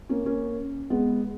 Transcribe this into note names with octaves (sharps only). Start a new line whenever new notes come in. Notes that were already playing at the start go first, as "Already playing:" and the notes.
A#3 C#4
A#3 C#4
G#3 B3